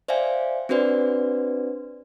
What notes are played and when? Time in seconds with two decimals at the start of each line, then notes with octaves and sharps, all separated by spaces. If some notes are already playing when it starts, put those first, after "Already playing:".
0.08 C5 D5 E5 F5 G5 G#5
0.69 C4 D4 F#4 B4 C5 D5